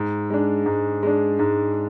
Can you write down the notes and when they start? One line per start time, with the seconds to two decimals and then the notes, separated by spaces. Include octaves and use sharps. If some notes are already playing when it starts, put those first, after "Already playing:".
Already playing: G#2
0.30 G#3 D4
0.66 G#2
1.03 G#3 D4
1.39 G#2